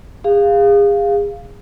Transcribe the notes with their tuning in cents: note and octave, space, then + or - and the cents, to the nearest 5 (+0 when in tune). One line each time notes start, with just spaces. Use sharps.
G#4 -35 F5 +0